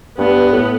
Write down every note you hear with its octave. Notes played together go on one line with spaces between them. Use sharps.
G2 B3
A2